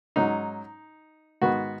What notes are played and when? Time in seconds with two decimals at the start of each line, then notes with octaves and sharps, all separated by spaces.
0.16 G#2 F#3 C#4 D#4
1.42 G#2 D#3 B3 F#4